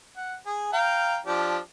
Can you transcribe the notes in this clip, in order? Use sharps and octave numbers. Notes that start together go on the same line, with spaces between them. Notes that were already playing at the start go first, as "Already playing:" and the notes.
F#5
G#4
F5 G5 A#5
F3 D4 G4